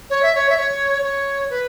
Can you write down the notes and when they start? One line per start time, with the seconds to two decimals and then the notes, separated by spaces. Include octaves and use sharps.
0.10 C#5
0.23 E5
0.35 C#5
0.50 E5
0.57 C#5
1.03 C#5
1.50 B4